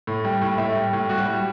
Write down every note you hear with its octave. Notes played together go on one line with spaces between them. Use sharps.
A2
G3
A2
A2 E5
G3
A2
G3 F#4
G3